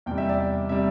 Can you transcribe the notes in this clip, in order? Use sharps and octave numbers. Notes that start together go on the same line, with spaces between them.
E2 C3 G3 G5
E5
D5
E5
C3 G3 E5